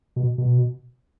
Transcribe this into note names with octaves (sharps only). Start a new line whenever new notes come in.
B2
B2